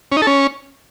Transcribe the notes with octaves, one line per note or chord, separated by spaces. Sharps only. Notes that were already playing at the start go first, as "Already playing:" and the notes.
C#4
D#4
A4
C#4